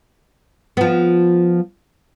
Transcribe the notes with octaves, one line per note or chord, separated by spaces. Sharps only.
F3 B3